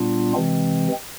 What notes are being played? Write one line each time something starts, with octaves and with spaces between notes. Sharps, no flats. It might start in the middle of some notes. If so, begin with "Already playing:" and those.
Already playing: A#2 G3 B3 D4 F4
C3 E3 G#3 C4